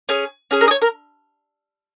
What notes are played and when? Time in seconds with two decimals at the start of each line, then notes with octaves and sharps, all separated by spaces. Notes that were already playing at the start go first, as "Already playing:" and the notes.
0.09 C#4 G#4
0.51 C#4 G#4
0.61 A#4
0.68 D#5
0.71 C#5
0.82 A#4